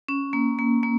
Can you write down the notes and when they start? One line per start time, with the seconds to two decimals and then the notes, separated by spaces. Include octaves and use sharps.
0.09 C#4
0.33 A#3
0.59 A#3
0.83 A#3